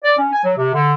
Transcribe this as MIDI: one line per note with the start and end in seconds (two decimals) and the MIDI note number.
0.03 0.16 74
0.17 0.27 61
0.32 0.44 80
0.44 0.53 54
0.58 0.71 48
0.73 0.94 50